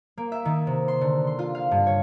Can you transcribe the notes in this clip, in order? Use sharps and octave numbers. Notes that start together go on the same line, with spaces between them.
A#3
E5
D#3
C3
C6
D3
C6
F4
F5
G2
C#5